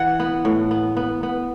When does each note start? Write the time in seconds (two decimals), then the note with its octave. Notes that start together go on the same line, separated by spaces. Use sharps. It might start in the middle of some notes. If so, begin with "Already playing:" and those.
Already playing: E3 F#5
0.20 B3
0.45 A2
0.71 B3
0.97 B3
1.23 B3